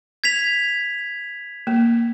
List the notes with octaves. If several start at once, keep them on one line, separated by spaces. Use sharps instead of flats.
G#6 B6 F7
A#3